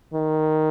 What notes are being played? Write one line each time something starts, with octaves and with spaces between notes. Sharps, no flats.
D#3